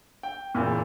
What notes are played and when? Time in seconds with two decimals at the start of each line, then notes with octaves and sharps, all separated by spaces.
0.23 G5
0.55 F#1 E2 A#2